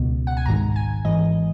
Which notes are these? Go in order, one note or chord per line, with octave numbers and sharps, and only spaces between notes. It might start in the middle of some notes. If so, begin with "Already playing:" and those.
Already playing: C#2 B2
F#5
G#5
G#1 G#2 D#3 A#5
G#5
G#1 G#2 E3 D#5